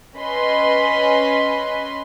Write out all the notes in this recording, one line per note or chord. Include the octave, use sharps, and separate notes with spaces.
C#4 B4 D#5 B5 C6